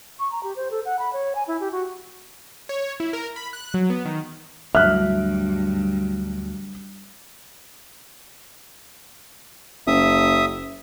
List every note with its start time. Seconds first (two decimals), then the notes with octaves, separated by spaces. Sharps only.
0.19 C#6
0.32 A#5
0.43 G4
0.56 C5
0.71 A4
0.85 F#5
0.99 B5
1.13 C#5
1.35 G#5
1.48 E4
1.60 G4
1.72 F#4
2.69 C#5
3.00 E4
3.13 A#4
3.36 B5
3.53 F#6
3.74 F#3
3.90 B3
4.05 D#3
4.75 D2 G2 F#3 E5 F6 F#6
9.87 F#1 E5 D#6